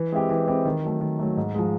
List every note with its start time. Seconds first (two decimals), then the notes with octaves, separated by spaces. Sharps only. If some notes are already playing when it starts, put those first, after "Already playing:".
Already playing: E3
0.12 G#3 C4 E4 G4
0.29 E3
0.47 G#3 C4 E4 G4
0.65 D#3
0.83 F#3 A3
1.01 D#3
1.19 F#3 A3
1.37 G#2
1.55 F3 G#3